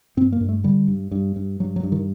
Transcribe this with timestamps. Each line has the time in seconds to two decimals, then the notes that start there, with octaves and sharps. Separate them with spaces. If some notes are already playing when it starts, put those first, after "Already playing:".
0.17 G2 C4
0.32 A#3
0.40 G2
0.49 A3
0.64 D3 G3
0.88 G2
1.11 G2
1.36 G2
1.60 G2 F#3
1.76 F#3
1.83 G2
1.92 D#3